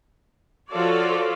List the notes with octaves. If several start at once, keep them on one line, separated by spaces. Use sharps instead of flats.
F3 F4 F#4 A4 C#5 D5